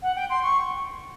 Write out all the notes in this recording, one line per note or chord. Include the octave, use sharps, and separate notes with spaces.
F#5
G5
C6
C#6